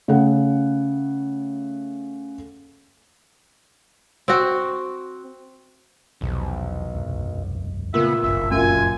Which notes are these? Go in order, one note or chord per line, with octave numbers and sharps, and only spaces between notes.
C#3 A3 F#5
C4 F#4
B1 E2 C3 F3
E1 C2 F#2
A#2 C#3 A3 B3 E5
F#1 B1 G2 E5
F#2 A#2 G#5